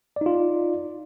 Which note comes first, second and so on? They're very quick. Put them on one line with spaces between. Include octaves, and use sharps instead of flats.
D5 D#4 F4